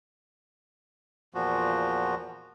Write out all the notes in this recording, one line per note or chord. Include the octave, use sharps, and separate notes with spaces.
E2 A#2 F3 F#4